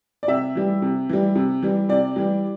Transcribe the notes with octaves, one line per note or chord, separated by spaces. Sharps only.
D5
C3 E5
E3 G3
C3
E3 G3
C3
E3 G3
C3 D5
E3 G3